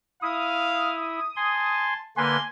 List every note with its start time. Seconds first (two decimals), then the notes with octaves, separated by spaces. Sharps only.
0.22 E4 F5 D#6
1.36 G#5 A5 C6
2.17 D3 A#3 B4 G#5 C6